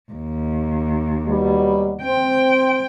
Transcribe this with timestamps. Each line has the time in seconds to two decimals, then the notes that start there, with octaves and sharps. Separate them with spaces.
0.11 D#2
1.25 B2 F#3 G3
2.02 C4 G5